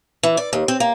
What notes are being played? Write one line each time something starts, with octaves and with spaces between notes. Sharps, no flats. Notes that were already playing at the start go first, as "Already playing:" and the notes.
E3
D5
D#2
C4
A#3